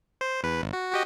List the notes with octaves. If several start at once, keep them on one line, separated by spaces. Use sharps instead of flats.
C5
E2 B4
G#1
F#4
F#4 G4 D#5